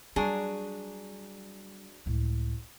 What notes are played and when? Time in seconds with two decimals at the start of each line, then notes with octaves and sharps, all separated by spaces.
0.16 F#3 G3 D4 G#4
2.06 C#2 A2